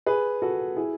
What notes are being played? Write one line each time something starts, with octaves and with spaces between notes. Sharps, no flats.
G#4 B4
F#4 A4
E4 G#4